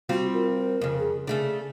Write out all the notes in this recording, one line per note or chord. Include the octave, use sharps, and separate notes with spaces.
G3 C4 F4 F#4
A#4
F2 C#3
G#4
C#3 A3 D4 G#4